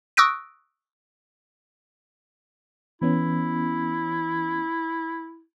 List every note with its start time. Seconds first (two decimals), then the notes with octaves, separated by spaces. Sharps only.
0.17 C#6 D#6 E6 F#6 A#6 D7
3.02 E3 B3 C#4 E4